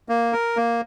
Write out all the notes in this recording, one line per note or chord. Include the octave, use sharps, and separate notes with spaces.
A#3
A#4
A#3